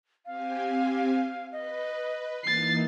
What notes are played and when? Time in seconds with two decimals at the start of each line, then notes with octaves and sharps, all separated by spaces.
0.26 C4 G4 F5 G#5
1.52 B4 D#5
2.43 E3 A#3 D#4 A6 C7